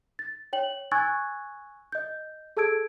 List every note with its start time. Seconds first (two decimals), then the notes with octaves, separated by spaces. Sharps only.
0.19 A6
0.53 C#5 G5 F#7
0.92 G#5 C#6 E6 F#6 G#6 A6
1.92 D#5 G6
2.57 G#4 A4 A5 E6 G#6 D7